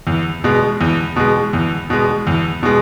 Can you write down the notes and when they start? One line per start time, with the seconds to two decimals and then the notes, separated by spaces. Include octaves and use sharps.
0.07 E2
0.44 B2 G#3
0.81 E2
1.16 B2 G#3
1.53 E2
1.90 B2 G#3
2.27 E2
2.63 B2 G#3